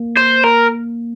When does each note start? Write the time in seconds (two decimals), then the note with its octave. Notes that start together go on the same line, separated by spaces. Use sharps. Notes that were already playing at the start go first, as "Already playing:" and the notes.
Already playing: A#3
0.17 C5
0.44 A#4